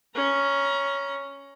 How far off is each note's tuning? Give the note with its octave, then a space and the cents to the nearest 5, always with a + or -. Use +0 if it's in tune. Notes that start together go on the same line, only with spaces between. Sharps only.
C#4 +5 A#5 +25